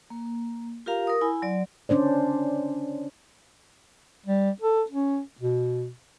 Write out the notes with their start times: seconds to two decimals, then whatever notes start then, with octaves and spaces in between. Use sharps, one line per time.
0.10 A#3
0.86 F4 G4 A#4 F5 A#5
1.07 A#4 D#6
1.21 E4 G#5 B5
1.42 F#3 D5
1.89 C#4 D4 C5 D5
4.25 G3
4.62 A4
4.90 C#4
5.40 B2